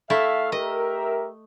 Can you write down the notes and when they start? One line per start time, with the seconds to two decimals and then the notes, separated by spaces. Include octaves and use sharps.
0.10 A3 E4 A4 E5 F5
0.52 G4 A#4 D#5 E5